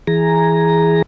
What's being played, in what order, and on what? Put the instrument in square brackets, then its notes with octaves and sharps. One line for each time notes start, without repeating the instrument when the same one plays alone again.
[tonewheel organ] E3 G#4 A#5